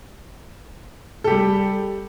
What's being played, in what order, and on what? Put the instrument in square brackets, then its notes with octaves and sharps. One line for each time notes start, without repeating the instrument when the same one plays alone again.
[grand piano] A4
G4
G3